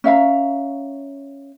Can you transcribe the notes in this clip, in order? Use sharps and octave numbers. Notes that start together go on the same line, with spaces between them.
C#4 E5 F5 A#5